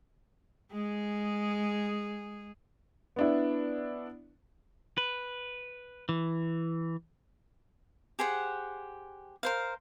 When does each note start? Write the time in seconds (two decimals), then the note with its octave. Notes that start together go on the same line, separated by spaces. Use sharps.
0.71 G#3 G#4
3.16 B3 D4 E4
4.98 B4
6.09 E3
8.19 G4 G#4 C5 F#5
9.43 A#4 C5 F5